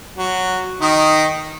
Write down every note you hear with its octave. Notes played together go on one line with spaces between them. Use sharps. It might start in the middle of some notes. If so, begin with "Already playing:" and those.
F#3
D#3 D#4